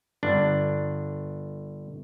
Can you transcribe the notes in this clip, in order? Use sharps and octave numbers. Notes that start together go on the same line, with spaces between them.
G1 D4